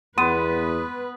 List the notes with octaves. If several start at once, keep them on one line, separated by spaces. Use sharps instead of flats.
E2 B3 B4 C6 D#7